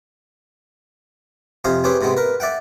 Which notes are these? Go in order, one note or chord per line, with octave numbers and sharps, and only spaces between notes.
F2 C3 C5 F5 G#5 D#6
C4 C#4 G4 G#4 B4 C5
G#2 C3 G#3 B3 C4
A#4 B4
D5 E5 F#5 G5